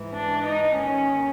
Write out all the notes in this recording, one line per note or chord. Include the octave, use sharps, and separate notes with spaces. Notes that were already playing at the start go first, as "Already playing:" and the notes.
Already playing: G#2 E3
D4
D#4
D#2 D#3 C#4